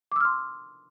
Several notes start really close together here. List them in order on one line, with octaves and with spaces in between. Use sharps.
D6 E6 F6 C6